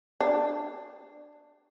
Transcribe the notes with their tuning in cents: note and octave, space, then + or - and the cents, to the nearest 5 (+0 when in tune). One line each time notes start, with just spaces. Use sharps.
D4 +10